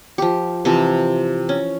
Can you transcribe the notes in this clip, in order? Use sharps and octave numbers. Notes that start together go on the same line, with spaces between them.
F3 G4
C3 E3 F3
C#4